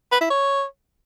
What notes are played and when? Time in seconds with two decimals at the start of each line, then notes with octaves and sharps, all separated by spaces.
0.12 B4
0.21 E4
0.30 C#5